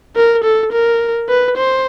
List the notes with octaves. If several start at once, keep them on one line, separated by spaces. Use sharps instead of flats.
A#4
A4
A#4
B4
C5